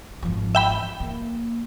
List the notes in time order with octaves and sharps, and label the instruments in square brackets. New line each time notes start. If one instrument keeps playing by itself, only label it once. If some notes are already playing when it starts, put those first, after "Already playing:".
[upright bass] G#1 F3
[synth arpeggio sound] E5 G5 B5
[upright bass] A#3